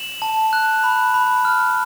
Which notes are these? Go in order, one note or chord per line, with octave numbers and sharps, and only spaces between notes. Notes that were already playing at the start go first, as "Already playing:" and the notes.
Already playing: E7 F#7
A5
F#6
B5
B5
F6